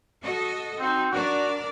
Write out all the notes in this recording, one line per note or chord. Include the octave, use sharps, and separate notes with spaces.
F#4 A4 D#5
C4 D#4 F#4
D4 F#4 A#4 D5